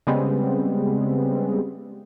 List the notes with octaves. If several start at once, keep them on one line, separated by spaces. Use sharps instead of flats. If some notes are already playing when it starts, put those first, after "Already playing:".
C#3 G3 G#3 B3 C4